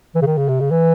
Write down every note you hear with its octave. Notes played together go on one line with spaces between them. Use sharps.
E3
C#3
D#3
C#3
C3
C#3
E3